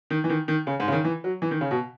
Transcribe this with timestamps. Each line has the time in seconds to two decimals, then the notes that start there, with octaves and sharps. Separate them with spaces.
0.10 D#3
0.24 E3
0.30 D#3
0.48 D#3
0.67 C#3
0.80 G#2
0.88 C#3
0.92 D#3
1.04 E3
1.24 F#3
1.42 E3
1.51 D#3
1.61 C#3
1.71 B2